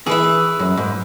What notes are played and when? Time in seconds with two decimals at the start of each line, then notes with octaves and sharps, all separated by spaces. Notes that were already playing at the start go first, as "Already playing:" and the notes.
0.06 E3 G#4 B4 E5
0.59 F#2
0.77 G#2